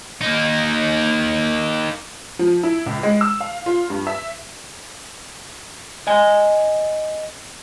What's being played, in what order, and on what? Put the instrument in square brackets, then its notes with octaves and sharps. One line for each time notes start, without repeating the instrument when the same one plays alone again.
[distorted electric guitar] A#3 D#4
[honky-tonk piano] F3
E4
C#2
G#3
E6
F5
F4
G2
E5
[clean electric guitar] D#5 G#5